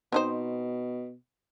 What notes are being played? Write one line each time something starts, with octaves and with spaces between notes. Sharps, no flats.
B2 C4 D#4 C5